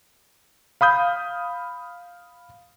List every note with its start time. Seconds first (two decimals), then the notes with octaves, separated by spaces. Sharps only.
0.81 F5 B5 D#6 G6